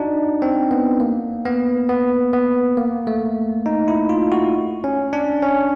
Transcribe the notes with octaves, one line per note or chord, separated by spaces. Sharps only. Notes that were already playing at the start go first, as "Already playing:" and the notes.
Already playing: D4 D#4 F#4
C4
B3
A#3
B3
B3
B3
A#3
A3
D#4
E4
F4
F#4
C#4
D4
C#4